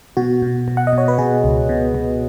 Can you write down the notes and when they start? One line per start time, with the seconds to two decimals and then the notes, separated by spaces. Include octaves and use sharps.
0.17 B2 F#4
0.42 B2
0.68 B2
0.77 F#5
0.87 D#5
0.93 B2 C#5
1.08 B4
1.18 B2 G#4
1.44 C#2
1.69 B2
1.95 B2